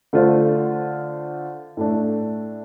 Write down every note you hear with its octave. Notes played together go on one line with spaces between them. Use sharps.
D3 A3 D4 F4 C5
A2 A3 D4